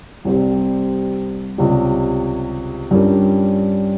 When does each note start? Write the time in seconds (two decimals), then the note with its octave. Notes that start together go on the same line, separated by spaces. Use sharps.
0.25 C2 C3 G3 C4 G4
1.58 C#2 C3 G3
2.91 G2 G3 C#4 F4 A#4